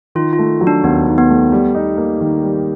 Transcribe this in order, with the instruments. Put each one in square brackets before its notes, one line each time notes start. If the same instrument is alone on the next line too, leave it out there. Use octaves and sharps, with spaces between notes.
[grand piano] D#3 [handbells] F4
[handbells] F4
[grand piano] A3
F#3
[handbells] D4
[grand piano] D#2 [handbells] B3
[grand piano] D#3
[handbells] B3
[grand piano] A3
G3
D#4
A#3
D#3
G3